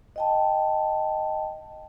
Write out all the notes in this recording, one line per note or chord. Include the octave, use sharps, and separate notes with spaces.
D#5 G5 A5